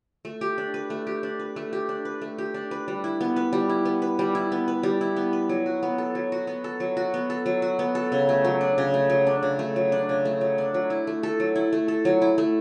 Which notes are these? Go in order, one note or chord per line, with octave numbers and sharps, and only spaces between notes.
A3
G4
D4
B4
A3
G4
D4
B4
A3
G4
D4
B4
A3
G4
D4
B4
G3
E4
B3
B4
G3
E4
B3
B4
G3
E4
B3
B4
G3
E4
B3
B4
F#3
F#4
B3
A4
F#3
F#4
B3
A4
F#3
F#4
B3
A4
F#3
F#4
B3
A4
C#3
A3
F#3
D4
C#3
A3
F#3
D4
C#3
A3
F#3
D4
C#3
A3
F#3
D4
F#3
E4
A3
A4
F#3
E4
A3
A4
F#3
E4
A3